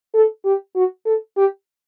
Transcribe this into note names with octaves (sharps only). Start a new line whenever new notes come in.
A4
G4
F#4
A4
G4